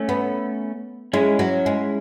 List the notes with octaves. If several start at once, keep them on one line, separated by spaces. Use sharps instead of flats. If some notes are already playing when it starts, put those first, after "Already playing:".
Already playing: A3 C#4
B3
G#3 C#4 E4
F#3
G#3